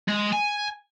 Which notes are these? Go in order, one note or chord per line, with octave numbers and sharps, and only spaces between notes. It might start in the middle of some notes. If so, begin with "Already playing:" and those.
G#3
G#5